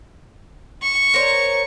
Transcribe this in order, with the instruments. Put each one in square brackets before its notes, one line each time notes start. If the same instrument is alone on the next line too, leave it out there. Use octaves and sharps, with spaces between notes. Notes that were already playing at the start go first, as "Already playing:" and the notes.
[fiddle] C#6
[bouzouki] A#4 C5 C#5